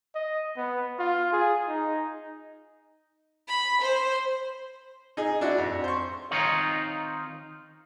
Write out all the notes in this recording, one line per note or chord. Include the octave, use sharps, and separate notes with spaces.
D#5
B3
F4
G#4
D#4
B5
C5
D#4 G#4
D4 E4 F#4
F2
C5 C#6
D#3 C4 D#4 F4 A#4 C#5